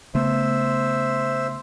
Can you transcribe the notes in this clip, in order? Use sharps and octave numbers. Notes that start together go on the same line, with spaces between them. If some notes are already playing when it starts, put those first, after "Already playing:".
C#3 A3 B3 C5 E5